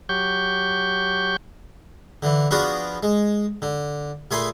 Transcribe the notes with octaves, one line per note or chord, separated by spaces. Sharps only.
F#3 G4 C#6 G6
D3 E3
F3 B3 D4 F4 F#4 G#4
G#3
D3
A#2 A3 G#4 G#5 B5 C6